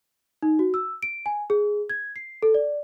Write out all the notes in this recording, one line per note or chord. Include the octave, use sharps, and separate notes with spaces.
D#4
F#4
E6
D7
G#5
G#4
G#6
C7
A4
D5